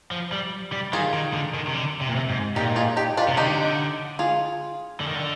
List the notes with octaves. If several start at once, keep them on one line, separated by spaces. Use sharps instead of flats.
F3
G3
G3
D#3 F4 G#4
D#3
D3
D#3
C3
D3
C3
A#2
C3
G#2
A#2 D#4 G4
F4 G#4
D#4 G4
D4 F4
C3
D3 D#4 G4
F4 G#4
D3
D#3
D3